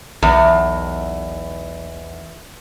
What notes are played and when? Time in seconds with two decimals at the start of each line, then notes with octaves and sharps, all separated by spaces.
0.23 B1 E2